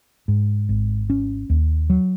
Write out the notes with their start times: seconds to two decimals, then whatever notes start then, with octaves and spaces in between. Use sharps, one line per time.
0.28 G#2
0.69 G#1
1.10 C#4
1.50 D#2
1.90 F#3